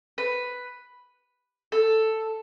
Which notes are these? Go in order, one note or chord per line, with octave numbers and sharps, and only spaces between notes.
B4
A4